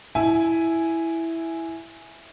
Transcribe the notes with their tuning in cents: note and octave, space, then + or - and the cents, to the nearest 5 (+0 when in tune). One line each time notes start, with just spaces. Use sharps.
E4 +0 G#5 +0